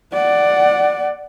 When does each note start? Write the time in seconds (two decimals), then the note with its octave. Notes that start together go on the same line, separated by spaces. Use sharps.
0.13 D5 F#5